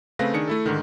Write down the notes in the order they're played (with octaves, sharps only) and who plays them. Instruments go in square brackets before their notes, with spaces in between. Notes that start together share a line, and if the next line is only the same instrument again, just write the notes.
[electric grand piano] C#3 A3 C4 B4 F5 A#6
D#3 D4 G#4 C#7
A3 E4 A4
G#2 D3 D#3